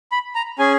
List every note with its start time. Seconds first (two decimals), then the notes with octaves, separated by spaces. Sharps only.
0.12 B5
0.35 A#5
0.59 C#4 G#4 G#5